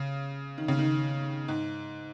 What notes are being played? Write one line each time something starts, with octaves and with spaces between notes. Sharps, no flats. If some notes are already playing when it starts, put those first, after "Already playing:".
Already playing: C#3
D#3
C#3
D#3
G#2